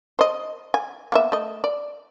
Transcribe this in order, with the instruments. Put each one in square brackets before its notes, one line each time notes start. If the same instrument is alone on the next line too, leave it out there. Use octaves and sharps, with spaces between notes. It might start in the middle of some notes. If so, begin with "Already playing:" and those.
[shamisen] C5 D#5
G#5
A#3 B3 E5
A3 D#5
D5